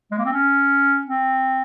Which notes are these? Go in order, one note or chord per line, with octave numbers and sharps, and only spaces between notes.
G#3
A#3
C4
C#4
C4